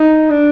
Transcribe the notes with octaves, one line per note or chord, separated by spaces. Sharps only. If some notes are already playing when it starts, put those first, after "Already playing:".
Already playing: D#4
D4